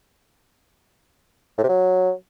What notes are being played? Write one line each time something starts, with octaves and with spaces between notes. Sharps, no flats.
A2
C3
F#3